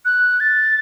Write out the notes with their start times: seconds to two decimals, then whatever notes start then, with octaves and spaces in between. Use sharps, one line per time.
0.05 F#6
0.40 A6